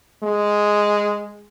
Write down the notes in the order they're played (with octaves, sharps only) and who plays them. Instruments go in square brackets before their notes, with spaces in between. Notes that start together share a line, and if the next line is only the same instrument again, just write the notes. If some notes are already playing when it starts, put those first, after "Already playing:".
[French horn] G#3